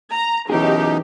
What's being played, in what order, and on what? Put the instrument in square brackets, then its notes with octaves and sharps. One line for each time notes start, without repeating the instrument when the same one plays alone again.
[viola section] A#5
[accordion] F#2 B2 D#4 [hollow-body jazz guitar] E3 C#4 G#4 [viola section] G4